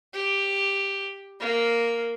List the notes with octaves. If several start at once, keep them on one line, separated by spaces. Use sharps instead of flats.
G4
A#3